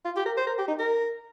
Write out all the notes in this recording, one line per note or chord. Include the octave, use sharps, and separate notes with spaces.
F4
G4
A#4
C5
A#4
G4
D#4
A#4